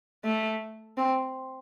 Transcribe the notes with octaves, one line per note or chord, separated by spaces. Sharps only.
A3
C4